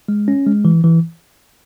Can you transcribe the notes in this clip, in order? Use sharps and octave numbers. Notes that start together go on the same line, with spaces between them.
G#3
C#4
G#3
E3
E3